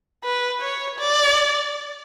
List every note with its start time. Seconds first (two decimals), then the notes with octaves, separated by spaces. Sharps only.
0.24 B4
0.62 C#5
0.99 D5